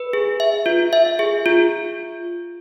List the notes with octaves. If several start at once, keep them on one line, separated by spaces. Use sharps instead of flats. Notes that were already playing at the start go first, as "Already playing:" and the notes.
Already playing: B4
G#4
E5
F4
E5
G#4
F4